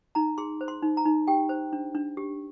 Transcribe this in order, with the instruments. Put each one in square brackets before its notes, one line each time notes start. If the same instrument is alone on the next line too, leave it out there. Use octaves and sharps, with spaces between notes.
[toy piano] D#4 A#5
G#4 C6
C5
C6
D#4
A#5
D#4
G4 G5
C5
D4
D4
G4